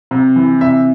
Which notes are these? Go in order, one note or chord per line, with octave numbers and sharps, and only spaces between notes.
C3
E3
C3 E5